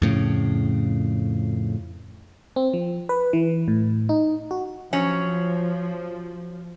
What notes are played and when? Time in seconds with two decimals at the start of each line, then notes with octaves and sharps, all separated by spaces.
0.02 F2 A2 C#3
2.56 C4
2.74 F3
3.09 B4
3.33 E3
3.68 A2
4.09 D#4
4.51 F#4
4.93 F3 F#3 C#4